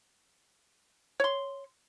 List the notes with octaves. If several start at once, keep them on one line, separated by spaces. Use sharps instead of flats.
C#5 C6